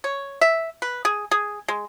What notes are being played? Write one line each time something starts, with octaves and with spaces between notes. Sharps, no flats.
C#5
E5
B4
G#4
G#4
G#3